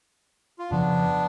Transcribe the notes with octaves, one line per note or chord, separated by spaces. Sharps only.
F4
F2 C#3 F3 B3 D4